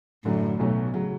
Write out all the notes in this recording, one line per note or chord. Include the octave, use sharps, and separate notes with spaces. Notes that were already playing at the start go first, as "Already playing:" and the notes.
F#2 A2 D3 F#3 A3
B1 B2 F#3 A3 C#4
C#3 F#3